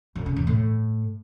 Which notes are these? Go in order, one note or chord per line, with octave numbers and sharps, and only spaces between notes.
F2
C#3
E2
A2